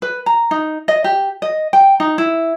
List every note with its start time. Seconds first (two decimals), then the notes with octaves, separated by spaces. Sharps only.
0.02 B4
0.26 A#5
0.51 D#4
0.88 D#5
1.04 G4
1.42 D#5
1.73 G5
2.00 D#4
2.18 E4